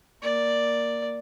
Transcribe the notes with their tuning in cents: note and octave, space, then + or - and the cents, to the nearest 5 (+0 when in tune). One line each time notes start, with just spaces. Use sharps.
A#3 +0 D5 +0